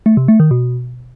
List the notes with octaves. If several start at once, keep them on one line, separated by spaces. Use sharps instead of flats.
A3
C3
A3
D#3
B2